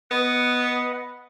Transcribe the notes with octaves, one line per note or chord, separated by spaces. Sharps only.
B3 B4 D#5 F#5